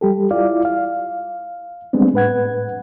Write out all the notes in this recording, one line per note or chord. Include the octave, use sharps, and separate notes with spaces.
G3 G4 A4
E4 F4 D5 F5
F5
G3 G#3 B3 C4 D4
A2 B4 F#5 G#6